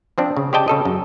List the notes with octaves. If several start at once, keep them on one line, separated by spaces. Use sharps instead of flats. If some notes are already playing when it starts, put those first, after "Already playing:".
F3 C4 D4
C#3
G4 C5 D5 D#5 G5 A5
C#3 A4 D#5
F#2